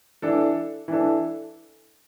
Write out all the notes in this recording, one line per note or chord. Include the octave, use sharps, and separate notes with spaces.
E3 D4 A4
E3 D4 A4